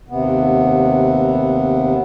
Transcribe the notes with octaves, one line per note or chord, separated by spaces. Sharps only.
D#2 C3 B3